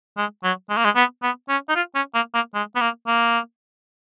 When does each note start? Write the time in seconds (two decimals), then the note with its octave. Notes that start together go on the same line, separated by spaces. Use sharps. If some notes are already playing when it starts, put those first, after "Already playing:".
0.17 G#3
0.44 F#3
0.70 G#3
0.77 A#3
0.85 G#3
0.96 B3
1.23 B3
1.49 C#4
1.69 D#4
1.75 F4
1.95 C#4
2.15 A#3
2.34 A#3
2.54 G#3
2.76 B3
2.81 A#3
3.07 A#3